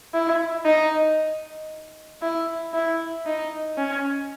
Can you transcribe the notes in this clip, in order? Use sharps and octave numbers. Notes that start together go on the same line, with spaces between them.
E4
D#4
E4
E4
D#4
C#4